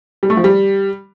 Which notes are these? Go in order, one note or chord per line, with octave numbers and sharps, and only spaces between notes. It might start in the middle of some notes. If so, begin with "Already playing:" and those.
G3
A3
F3
G3